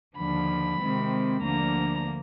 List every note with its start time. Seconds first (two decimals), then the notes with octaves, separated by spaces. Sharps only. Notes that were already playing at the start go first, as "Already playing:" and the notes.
0.17 D#2 D3 F3 B5
0.80 C3 D#3 G#3 C4
1.42 D2 D3 F3 A#3 A#5